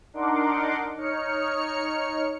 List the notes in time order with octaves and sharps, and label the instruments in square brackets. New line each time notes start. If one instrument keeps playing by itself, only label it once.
[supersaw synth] D4 D#4 A#4 F#5 C6 D6
D#4 C#5 F6 C#7